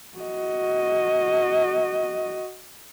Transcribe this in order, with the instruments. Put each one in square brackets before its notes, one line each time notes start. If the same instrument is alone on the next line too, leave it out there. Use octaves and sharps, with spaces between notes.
[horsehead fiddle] F#4 D#5